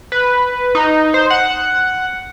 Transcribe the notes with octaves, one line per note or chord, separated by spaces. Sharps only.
B4
D#4
C5
F#5